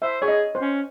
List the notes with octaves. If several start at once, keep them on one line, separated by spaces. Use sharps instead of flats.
C5 E5
G#4 C#5
D#5
C5
C#4